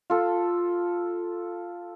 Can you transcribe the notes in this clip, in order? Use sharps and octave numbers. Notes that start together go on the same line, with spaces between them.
F4 A4